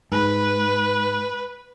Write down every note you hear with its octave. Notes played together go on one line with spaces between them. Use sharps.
G#2 B4